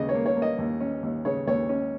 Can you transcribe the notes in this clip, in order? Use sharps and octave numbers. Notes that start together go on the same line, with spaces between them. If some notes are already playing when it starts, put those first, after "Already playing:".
Already playing: D#2 C#3 D#5
C#5
A#3
C#5
A#3
D#5
D#2
C#4
D#2
C#3 C#5
D#2 C#5
C#4